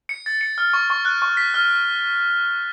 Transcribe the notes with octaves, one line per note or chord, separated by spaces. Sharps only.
C#7
A6
C#7
F6
C#6
C#6
F#6
C#6
B6
F6